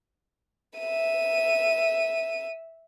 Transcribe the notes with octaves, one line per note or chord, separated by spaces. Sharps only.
E5 D#7